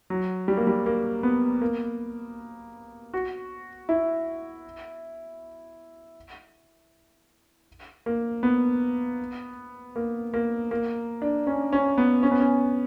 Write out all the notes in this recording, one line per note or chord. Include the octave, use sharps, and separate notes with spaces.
F#3
G3
A#3
G3
A#3
B3
A#3
F#4
E4
A#3
B3
A#3
A#3
A#3
D4
C#4
C#4
B3
C#4
B3
C#4